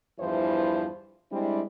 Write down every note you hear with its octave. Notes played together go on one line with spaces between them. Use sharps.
E2 G2 E3 F3 E4 C5
G3 G#3 C4 D4 E4